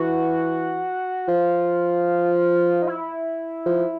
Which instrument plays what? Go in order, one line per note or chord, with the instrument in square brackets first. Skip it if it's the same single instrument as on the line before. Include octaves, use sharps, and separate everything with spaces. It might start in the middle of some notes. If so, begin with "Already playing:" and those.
Already playing: [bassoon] E3 [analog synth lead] F#4
[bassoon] F3 [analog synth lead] F4
[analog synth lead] D#4
E4
[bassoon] F3